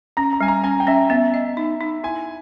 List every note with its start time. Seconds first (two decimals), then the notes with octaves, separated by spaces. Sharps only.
0.17 C#4 A#5
0.33 A#5
0.41 G3 G#5
0.48 A#5
0.64 C#4 G#5
0.80 G5
0.87 C#4 E5
1.10 B3 E5
1.34 D#5
1.57 D#4
1.81 D#4
2.04 E4 G#5